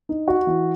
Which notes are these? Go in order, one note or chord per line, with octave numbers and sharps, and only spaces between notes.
D#4
F#4
E3